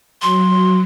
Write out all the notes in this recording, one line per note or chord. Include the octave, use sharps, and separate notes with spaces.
F#3 C6